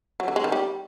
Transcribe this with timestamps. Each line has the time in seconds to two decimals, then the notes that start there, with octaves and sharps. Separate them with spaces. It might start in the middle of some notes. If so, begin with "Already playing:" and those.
0.20 F#3
0.28 D3
0.36 G#3
0.44 D#3
0.52 G3